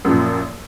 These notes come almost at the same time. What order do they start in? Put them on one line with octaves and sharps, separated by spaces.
F#2 F3 A#2